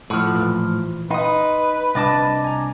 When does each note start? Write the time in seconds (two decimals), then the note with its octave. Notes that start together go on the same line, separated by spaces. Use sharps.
0.10 A2 F3 A4 F#5
0.34 A#2 E3
1.10 D#4 B4 C6 D#6
1.95 C2 D4 D#5 A5 A6 A#6
2.44 G#5 A#5